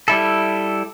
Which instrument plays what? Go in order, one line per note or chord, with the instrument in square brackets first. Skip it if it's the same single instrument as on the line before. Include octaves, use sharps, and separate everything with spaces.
[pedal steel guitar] G3 E4 A4